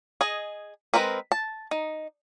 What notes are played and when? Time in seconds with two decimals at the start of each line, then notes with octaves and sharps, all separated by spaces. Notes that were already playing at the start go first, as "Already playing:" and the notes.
0.21 G#4 D#5
0.94 G#3 C4 A#4 B4
1.32 A5
1.71 D#4